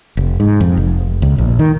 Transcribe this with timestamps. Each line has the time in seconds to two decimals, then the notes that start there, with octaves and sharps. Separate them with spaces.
0.17 F1
0.40 G#2
0.60 F2
0.77 F1
1.22 C#2
1.38 A#1
1.59 D#3